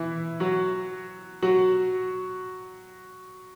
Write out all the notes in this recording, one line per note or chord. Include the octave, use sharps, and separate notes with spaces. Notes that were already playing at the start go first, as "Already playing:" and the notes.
Already playing: E3 E4
F#3 F#4
F#3 F#4